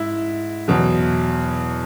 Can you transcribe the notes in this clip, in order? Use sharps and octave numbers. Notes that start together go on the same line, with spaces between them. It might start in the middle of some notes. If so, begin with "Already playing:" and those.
Already playing: G#2 E4
E2 B2 F#3